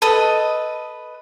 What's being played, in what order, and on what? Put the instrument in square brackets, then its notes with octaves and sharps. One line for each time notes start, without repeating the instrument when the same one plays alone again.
[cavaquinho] A4 B4 D#5 D#6